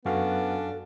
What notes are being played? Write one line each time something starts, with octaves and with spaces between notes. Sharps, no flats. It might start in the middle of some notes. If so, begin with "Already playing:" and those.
F#2 B3 C#4 D4 F#4 A4 F5